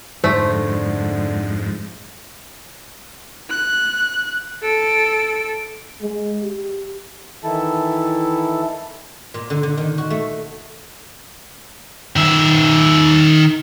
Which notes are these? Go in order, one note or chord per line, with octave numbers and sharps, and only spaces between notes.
F2 G#2 D3 A3 C5
F#6
A4 D7
G#3
G4
D#3 E3 E4 A4 A5
A#2
D3
D3
D#3
F#4
A3
D#3 E5